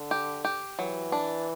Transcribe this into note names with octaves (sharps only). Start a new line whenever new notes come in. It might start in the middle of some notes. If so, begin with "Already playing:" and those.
Already playing: D3
G4
G4
E3 F#3
D4